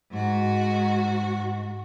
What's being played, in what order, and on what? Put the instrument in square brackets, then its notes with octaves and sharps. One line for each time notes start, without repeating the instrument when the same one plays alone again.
[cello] G#2 F#4